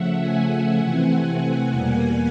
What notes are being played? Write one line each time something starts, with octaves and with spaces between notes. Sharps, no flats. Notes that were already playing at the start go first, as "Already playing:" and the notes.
Already playing: C#3 F3 A3 E5 F#5
F#5 G#5
F#5 G#5
C3 E3 A3 C4
E2 B2 G3 A#3 F#5 G#5